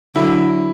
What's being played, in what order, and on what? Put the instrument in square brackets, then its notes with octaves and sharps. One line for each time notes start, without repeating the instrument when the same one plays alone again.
[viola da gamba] D3 F#3 [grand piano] E4